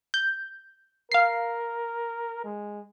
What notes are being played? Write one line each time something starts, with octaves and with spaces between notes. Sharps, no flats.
G6
A#4 F5 C7
G#3